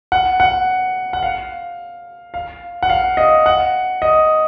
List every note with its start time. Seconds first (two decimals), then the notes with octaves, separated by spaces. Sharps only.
0.12 F#5
0.40 F#5
1.13 F#5
1.23 F5
2.34 F5
2.83 F#5
2.90 F5
3.17 D#5
3.46 F#5
4.02 D#5